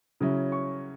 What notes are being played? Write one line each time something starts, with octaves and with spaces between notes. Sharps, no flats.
C#3 F#3 C#4 E4
C#6